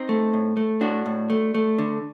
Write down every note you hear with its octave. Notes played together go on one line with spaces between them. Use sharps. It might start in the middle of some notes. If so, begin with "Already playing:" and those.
Already playing: C4 D#4
A3
A2
A3
A2 D4 F#4
A2
A3
A3
D3